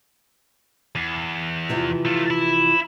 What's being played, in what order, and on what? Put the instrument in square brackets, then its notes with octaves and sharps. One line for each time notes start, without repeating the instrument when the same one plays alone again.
[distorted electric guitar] E2
[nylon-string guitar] C3 E3 F3
[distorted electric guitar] A3 F4
E4